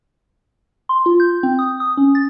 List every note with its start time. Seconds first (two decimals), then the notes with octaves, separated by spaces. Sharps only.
0.89 C6
1.06 F4
1.20 G6
1.43 C4
1.59 D#6
1.80 D#6
1.97 C#4
2.15 A6